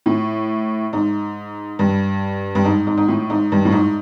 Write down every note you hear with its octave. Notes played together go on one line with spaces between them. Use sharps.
A2
G#2
G2
G2
G#2
G#2
G#2
A2
G#2
G2
A2
G#2